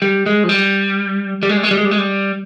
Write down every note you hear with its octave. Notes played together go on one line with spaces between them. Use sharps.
G3
G#3
F3
G3
G3
G#3
G3
G#3
G3
G#3
G3
G#3
G3